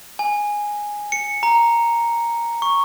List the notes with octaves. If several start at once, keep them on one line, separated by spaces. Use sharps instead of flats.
G#5
C#7
A#5
C#6